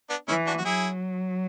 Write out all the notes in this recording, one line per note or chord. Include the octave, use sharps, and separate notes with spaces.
B3 D4
E3 C#4 E4
D4 F#4
F#4
F#3 E4 G#4